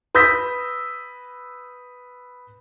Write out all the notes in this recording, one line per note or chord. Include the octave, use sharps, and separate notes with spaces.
B4 D#6 E6 G6 A#6 B6